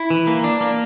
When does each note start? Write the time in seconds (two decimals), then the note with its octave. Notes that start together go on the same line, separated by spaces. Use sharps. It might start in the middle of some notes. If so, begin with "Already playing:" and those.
Already playing: E4
0.10 E3
0.27 A#3
0.44 D4
0.61 A#3